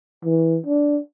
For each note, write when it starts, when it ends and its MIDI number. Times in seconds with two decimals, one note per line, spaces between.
0.24 0.58 52
0.66 0.99 62